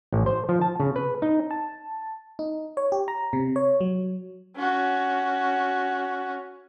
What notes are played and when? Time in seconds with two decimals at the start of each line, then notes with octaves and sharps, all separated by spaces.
0.12 A1
0.26 C5
0.49 F3
0.61 A5
0.80 C#3
0.96 B4
1.22 D#4
1.51 A5
2.39 D#4
2.77 C#5
2.92 G4
3.08 A#5
3.33 C3
3.56 C#5
3.81 F#3
4.57 C#4 F#4